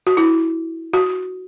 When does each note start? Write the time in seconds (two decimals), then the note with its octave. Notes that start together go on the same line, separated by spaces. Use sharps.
0.07 F#4
0.17 E4
0.93 F#4